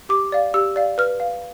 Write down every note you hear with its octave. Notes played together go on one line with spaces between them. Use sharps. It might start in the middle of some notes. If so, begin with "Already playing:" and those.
G4 D6
D5 F5
G4 E6
D5 F5
B4 F6
F5